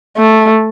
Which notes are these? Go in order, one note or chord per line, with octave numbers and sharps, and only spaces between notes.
A3